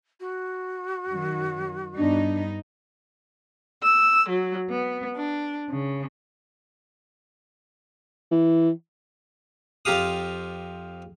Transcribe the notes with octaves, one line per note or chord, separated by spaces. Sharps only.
F#4
F#2 D#3 F#3
G2 B3 D4 D#4
E6
F#3
B3
D4
C#3
E3
F2 C4 F4 G4 F5 D#6